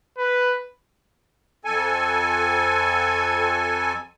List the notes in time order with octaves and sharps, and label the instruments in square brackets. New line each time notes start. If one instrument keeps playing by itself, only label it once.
[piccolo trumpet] B4
[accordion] F2 A4 G#5